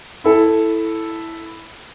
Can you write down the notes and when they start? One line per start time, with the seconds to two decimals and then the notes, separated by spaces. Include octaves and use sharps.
0.24 E4 A4